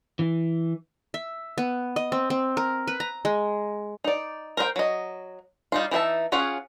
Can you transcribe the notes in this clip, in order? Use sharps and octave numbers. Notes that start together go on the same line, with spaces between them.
E3
E5
B3
D#5
C4
C4
A#4
B4
A#5
G#3
D#4 D5
A#4 C5 D#5 G5
F#3 D#5
G3 D#4 F4
E3 D#4 G#4 E5 A5
C#4 F4 G#4 C#5 F#5